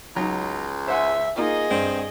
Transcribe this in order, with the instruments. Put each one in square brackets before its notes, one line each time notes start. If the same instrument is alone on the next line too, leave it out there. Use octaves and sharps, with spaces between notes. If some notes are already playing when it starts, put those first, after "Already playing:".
[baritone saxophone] C#2 [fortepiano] F#3 D#4
[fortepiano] C5 F#5 G#5 [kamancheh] E5
[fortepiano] A#3 D#4 F4 [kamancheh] G#4 D#5
[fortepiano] G2 D4 [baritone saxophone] C4